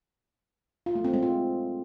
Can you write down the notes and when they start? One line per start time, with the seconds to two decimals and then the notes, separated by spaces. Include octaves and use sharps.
0.86 F4
0.95 A3
1.04 C4
1.13 G#3
1.23 F4